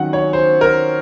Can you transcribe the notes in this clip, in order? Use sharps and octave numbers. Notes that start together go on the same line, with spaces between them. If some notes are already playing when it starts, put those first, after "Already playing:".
Already playing: D#3 F#3 C#4 F#5
C#5
C5
A#4